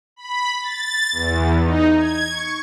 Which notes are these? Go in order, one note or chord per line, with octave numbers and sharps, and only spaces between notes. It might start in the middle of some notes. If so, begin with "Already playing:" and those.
B5
A6
E2
D#4
G#6
C#6